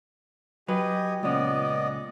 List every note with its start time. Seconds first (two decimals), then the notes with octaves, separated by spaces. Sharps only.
0.68 F#3 G4 B4 D#5 G#5
1.23 C#2 A#2 B3 C#4 D5 D#5